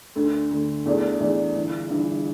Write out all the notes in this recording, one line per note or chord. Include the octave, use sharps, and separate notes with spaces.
D2 D3 A3
D2 D3 A3
E2 E3 A3 D4
E2 E3 A3 D4
G1 G2 E3
G1 G2 E3